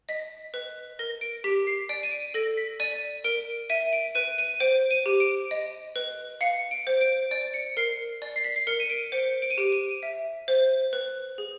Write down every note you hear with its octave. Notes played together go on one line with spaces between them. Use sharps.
D#5 B6
B4
A#4 A#6
D7
G4 B6
C7
D5 D7
D#7
D7
A4 A#6
B6
D5 D#7
A#4 D7
E5 D#7
D7
B4 D#7
D#7
C5 D7
D#7
G4
D7
D#5
B4
F5 C#7
D7
C5
D7
D5 D7
C#7
A#4 C7
D5
C7
B6
C7
A#4 C#7
D#7
D7
C5 C#7
D7
D#7
G4 D7
D#7
E5
C5
B4
G#4